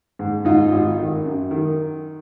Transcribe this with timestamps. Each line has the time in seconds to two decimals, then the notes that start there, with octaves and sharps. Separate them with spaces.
0.19 G#2
0.45 G#2 D#4 F4
0.71 G#1
0.98 D#3
1.25 F#2
1.51 D#3